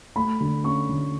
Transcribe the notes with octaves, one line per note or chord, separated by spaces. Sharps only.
A3 B5
D3
C#4 C#6
D3